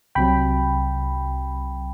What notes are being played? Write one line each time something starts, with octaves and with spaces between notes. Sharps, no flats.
C2 C3 F#3 G5 B5